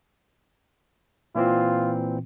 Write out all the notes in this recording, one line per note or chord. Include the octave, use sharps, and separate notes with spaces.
A#2 E3 C4 F4